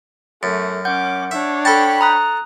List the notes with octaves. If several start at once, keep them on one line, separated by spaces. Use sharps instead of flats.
F#2 A3
C#4 F#5 D6 G6
D4 C#5 E5
A4 G5 A5 B5
A#5 D#6 F#6